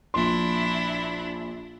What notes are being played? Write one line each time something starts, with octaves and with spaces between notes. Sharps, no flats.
A#1 D4 E4 C6